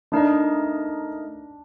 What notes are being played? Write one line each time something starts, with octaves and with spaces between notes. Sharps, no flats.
A3 D4 D#4 A#4 D#5